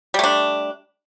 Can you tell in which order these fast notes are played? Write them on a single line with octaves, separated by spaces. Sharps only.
G3 A3 D4